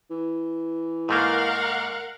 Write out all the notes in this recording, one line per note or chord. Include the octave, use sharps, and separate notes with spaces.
E3
G#2 A3 A#3 A#4 F5 F#5